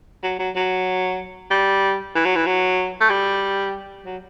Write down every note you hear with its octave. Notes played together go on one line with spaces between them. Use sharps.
F#3
F#3
F#3
G3
E3
F#3
E3
F#3
A3
G3
F#3